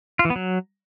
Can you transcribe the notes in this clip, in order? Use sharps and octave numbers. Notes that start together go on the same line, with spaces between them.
F4
E3
B3
F#3